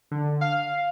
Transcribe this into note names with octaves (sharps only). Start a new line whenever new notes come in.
D3
F5